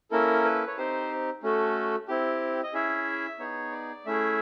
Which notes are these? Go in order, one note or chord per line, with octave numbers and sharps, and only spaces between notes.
A#3 C#4 E4 A4 A#4
B4
C#5
C4 D#4 G4 C5
A3 C#4 F#4 A4
C4 E4 G4
D#5
C#4 E4 G#4 E5
B3 D#4 G#4 C#5
D5
A3 C#4 E4 G#4 E5